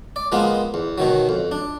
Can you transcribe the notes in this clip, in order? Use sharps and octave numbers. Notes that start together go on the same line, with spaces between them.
D5
F3 G#3 A#3 B3 F4
E2
B2 D#3 F#3
F2
D4